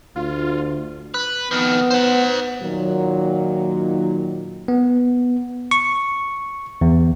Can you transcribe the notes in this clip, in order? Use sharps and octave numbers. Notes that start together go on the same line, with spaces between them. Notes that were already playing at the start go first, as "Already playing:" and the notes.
D2 F4
B4
F2 D#3 B3
C5 F#5
A#2 D#3 F#3
B3
C#6
E2